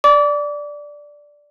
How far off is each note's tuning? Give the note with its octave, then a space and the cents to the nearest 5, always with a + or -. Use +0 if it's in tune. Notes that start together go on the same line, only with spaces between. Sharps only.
D5 +0 D6 -30